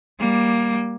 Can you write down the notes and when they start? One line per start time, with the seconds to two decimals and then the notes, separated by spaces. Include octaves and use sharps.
0.19 G3 A#3